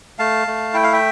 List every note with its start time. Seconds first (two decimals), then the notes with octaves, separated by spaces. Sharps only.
0.19 A3 F5 A5
0.47 A3
0.74 E4 G5
0.84 F5
0.93 E5 G5